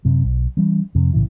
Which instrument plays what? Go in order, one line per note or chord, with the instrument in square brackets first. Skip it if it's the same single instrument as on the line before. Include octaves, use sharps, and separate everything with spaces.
[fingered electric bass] F#2 C3
B1
E3 G3 C#4
F2 C3
B1 A2 C#3 E3